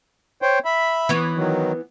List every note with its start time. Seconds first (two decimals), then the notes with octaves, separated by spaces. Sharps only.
0.42 C5 C#5 G5
0.65 E5 B5
1.09 E3 B3 C#5
1.36 D#3 F#3